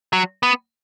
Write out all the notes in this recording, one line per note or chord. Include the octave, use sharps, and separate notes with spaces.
F#3
B3